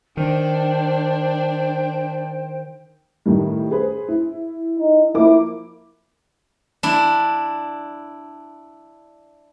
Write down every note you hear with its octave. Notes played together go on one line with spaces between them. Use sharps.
D#3 D4 C5 G5
A2 D#3 G3
G#4 B4 C5
E4
D#4
F3 A#3 E4 D6
D4 E4